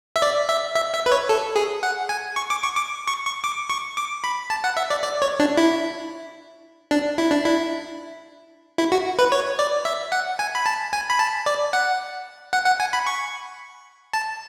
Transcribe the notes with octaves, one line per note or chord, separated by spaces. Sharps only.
E5
D5
E5
E5
E5
B4
C#5
A4
G#4
F#5
G#5
C#6
D6
C#6
D6
C#6
C#6
D6
C#6
D6
B5
A5
F#5
E5
D5
D5
C#5
D4
E4
D4
E4
D4
E4
E4
F#4
B4
C#5
D5
E5
F#5
G#5
B5
A5
G#5
B5
A5
D5
F#5
F#5
F#5
G#5
B5
C#6
A5